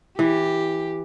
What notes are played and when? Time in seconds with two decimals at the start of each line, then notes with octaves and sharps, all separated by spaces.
0.19 E3 G4